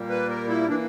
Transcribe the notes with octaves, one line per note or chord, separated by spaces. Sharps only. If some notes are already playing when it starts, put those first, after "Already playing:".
Already playing: A#2 G3 A#3
B4
A#4
E4
E3 A#3 D4